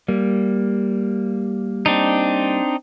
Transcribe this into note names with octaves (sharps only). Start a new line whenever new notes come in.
G3 A#3
C4 D4 D#4